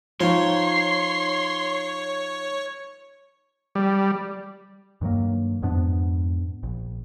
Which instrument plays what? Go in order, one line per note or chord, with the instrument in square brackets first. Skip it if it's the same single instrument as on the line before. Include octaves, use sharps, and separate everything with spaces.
[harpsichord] F3 [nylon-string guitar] D#4 G5 [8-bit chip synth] C#5 [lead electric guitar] C6
[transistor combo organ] G3
[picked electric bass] G2 D#3 F#3 A#3
F2 G#2 B3 D4
A#1